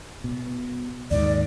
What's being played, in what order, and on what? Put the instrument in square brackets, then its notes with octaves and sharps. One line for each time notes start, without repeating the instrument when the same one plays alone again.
[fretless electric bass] B2
[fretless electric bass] D#2 G#2 D#3 [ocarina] D5